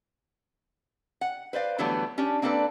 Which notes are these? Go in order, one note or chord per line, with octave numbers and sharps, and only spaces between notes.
F#5
B4 C5 D5 F5
D3 E3 F#3 G3 A3 B3
C#4 D4 G4
A#3 C4 D4 A4 B4 D5